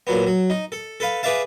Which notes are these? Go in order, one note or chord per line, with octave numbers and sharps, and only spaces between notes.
A#2 F#3 B3
F#3
D#4
A4
A4 B4 F5
G#4 B4 D5 E5 F5 A5